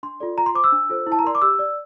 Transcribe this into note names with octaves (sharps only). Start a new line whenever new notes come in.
D4 C6
F4 A4 D5
F4 A#5
C6
C5 D6
E6
D4
F4 A4 C5
E4
A5
A#5
A#4 D5 C6
D6
G4 E6
D5